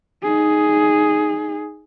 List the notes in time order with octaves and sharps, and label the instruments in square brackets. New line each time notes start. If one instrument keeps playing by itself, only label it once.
[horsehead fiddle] D#4 G#4